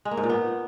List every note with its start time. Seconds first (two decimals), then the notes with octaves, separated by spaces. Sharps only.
0.05 G#3
0.11 A#3
0.17 G#2
0.23 A#2
0.29 B3